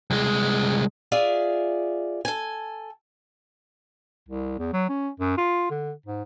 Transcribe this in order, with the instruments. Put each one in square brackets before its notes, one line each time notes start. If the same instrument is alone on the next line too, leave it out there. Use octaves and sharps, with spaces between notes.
[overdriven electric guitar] C2 G#3
[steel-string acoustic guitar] F4 G#4 D5 E5
A4 G#5
[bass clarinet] C2
E2
F#3
C#4
F#2
F4
D3
G#2